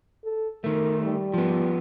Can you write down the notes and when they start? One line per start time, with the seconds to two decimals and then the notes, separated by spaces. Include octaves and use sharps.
0.24 A4
0.64 D#3 A3 A#4
1.02 G3
1.34 F3 B3